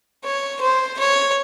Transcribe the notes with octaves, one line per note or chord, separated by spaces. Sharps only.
C#5
C5
C#5